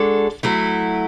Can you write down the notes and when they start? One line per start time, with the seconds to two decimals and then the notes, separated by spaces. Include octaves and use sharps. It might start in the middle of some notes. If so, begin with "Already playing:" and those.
Already playing: G#3 D4 F#4 A4
0.43 F#3 A3 E4